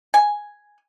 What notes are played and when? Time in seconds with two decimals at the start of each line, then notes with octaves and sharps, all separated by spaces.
0.14 G#5